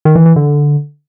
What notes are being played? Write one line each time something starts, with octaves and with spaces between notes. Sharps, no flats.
D#3
E3
E3
D3